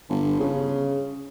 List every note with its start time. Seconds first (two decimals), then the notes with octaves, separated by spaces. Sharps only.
0.09 G1
0.40 C#3